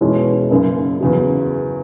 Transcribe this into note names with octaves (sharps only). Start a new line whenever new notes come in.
E2 B2 G#3 C#4 E4
F#1 F#2 C#3
E2 C#3 F#3